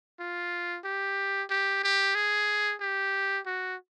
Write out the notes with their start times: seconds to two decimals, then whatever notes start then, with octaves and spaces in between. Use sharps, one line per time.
0.20 F4
0.84 G4
1.50 G4
1.83 G4
2.15 G#4
2.81 G4
3.46 F#4